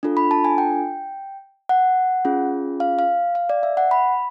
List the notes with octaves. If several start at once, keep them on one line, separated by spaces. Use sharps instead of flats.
D4 F4 A4
B5
A5
G#5
G5
F#5
C#4 F4 G#4
F5
F5
F5
D5
E5
F#5
B5